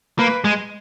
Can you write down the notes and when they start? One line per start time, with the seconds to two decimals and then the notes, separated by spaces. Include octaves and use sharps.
0.19 A#3 B4
0.44 G#3